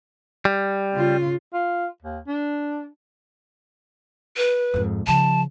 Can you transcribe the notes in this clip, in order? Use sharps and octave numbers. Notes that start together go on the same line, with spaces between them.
G3
C#3 F4
F4
D#2
D4
B4
F2 G#2
C#3 F3 A5